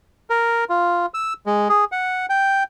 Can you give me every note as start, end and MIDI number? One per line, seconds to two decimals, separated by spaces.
0.30 0.64 70
0.69 1.06 65
1.14 1.33 88
1.46 1.68 56
1.69 1.85 68
1.92 2.26 78
2.29 2.63 79